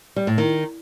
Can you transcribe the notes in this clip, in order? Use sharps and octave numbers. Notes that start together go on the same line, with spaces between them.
G3
A2
D#3